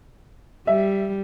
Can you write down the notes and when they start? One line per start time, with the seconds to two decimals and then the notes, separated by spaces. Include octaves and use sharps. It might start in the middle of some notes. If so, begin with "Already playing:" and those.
0.67 G3 E5